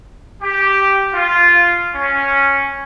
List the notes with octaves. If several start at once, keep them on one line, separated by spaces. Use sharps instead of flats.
G4
F4
C#4